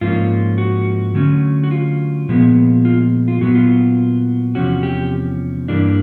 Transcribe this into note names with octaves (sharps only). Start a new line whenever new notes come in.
G#2 F3 A#3 C#4 F4
F#4
D3 F#3 A3 C#4
F#4
F4
A#2 F3 G#3 B3
F4
F4
A#2 F#3 B3 F#4
F4
E2 C3 F3 C#4 F#4
G4
G2 E3 G3 A#3 D4